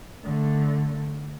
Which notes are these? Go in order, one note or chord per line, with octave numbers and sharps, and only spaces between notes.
D3 A3